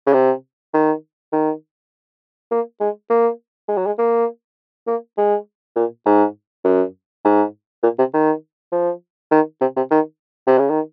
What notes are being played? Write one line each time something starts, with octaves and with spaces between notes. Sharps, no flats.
C#3
C3
D#3
D#3
A#3
G#3
A#3
G#3
F#3
G#3
A#3
A#3
G#3
A#2
G#2
F#2
G#2
A#2
C3
D#3
F3
D#3
C3
C3
D#3
C3
C#3
D#3